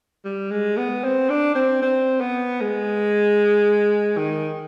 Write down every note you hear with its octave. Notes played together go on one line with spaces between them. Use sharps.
G3
G#3
B3
C4
D4
C4
C4
B3
G#3
D#3